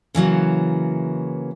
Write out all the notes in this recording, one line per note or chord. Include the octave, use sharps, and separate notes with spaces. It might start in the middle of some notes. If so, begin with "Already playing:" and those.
C#3 E3 F#3 A#3